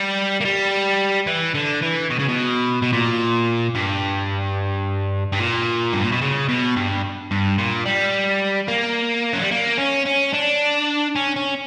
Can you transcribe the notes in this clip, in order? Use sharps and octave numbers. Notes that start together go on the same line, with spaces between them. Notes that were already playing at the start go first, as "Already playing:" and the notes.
Already playing: G3
A#3
G3
E3
D3
E3
B2
C#3
B2
B2
A#2
G2
G2
A#2
G2
A#2
B2
C#3
B2
G2
G2
A#2
G3
A#3
F#3
G3
A#3
C#4
C#4
D4
C#4
C#4